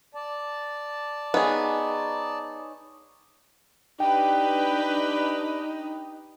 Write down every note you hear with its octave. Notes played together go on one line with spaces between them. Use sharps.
D5 A5
B3 D#4 G#4 C#5 G#5
D4 D#4 G4 B4 G5